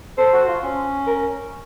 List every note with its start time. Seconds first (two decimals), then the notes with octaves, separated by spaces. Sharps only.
0.18 A4 C5
0.33 F#4
0.47 F4
0.63 C#4
1.07 A#4